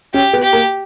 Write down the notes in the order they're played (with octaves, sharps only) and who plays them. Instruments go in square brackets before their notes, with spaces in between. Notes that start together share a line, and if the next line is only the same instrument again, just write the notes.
[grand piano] C#4 [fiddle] G4
[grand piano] B3
[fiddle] G4
[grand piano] A#3